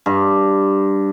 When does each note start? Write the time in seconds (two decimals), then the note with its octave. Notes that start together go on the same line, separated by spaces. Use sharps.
0.06 G2